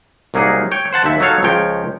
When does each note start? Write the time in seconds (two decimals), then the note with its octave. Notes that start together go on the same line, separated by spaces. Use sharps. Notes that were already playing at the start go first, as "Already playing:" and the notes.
0.34 C2 F#3 A#3 D#4 G#4
0.72 C#5 G5
0.92 C5 F#5 A5
1.04 D#2 E5
1.20 F#3 D#4 A4 C#5 F5
1.43 C#2 F3 C#5 G5